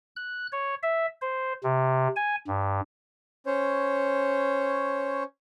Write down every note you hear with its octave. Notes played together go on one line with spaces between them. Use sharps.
F#6
C#5
E5
C5
C3
G#5
G2
C#4 C5 C#5